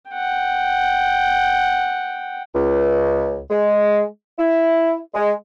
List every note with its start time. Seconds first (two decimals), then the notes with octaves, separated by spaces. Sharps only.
0.11 F#5 G5
2.54 C#2
3.50 G#3
4.39 E4
5.14 G#3